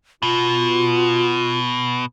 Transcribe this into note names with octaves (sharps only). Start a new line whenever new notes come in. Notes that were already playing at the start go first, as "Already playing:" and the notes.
B2 F4